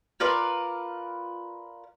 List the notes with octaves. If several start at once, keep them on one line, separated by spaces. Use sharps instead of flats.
F4 A#4 B4 D5